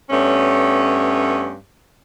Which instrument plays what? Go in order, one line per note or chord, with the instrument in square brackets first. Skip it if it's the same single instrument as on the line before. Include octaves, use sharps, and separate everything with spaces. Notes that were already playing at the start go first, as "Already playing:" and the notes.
[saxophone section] G2 A3 B3 C#4